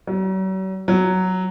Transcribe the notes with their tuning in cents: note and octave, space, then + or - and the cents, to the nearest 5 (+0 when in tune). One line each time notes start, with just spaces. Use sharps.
F#3 +45
F#3 +5